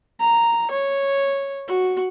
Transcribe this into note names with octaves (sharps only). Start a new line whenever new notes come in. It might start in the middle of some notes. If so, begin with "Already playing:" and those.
A#5
C#5
F#4